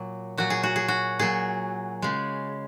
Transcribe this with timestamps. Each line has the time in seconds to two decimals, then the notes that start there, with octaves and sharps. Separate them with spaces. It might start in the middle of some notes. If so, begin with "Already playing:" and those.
Already playing: A#2 F#3
0.38 A#2 F#3 F#4
0.50 G#4
0.63 F#4
0.76 G#4
0.88 F#4
1.19 A#2 F#3 G#4
2.02 C#3 G#3